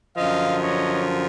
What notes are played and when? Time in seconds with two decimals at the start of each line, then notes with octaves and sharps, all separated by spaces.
0.16 F#2 D3 F3 D#5 F5
0.63 C#5 D#5